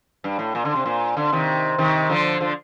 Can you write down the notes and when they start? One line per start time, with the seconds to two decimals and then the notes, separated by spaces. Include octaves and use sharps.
0.24 G2
0.39 A2
0.55 A#2
0.65 D3
0.75 C3
0.86 A#2
1.17 D3
1.32 C3 D#3
1.78 C3 D#3
2.10 D3 F3
2.40 D3 F3